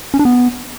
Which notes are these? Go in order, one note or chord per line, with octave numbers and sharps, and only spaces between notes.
C#4
D4
B3